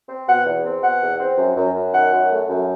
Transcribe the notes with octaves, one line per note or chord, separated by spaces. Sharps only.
C4
B2 F#5
E2
C4
B2 F#5
E2
C4
F#2
F#2
F#2
D#3 F#5
F#2
A3
F#2